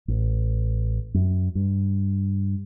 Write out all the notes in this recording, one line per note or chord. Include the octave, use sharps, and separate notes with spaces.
A1
F#2
G2